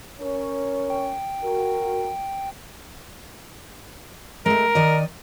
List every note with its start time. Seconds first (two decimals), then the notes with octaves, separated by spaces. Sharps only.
0.20 C#4 A#4 C#5
0.90 G5
1.43 F#4 A#4
4.46 G#3 A3 A#4
4.75 D#3 D5 D#5